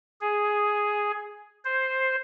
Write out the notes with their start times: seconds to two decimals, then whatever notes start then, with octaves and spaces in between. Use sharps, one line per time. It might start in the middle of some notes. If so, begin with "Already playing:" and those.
0.21 G#4
1.65 C5